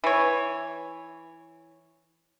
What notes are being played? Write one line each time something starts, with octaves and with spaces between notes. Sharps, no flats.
E3 C#5